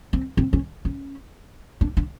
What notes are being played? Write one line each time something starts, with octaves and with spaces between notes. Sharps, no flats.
C4
C4
C#4
C#4
D4
D4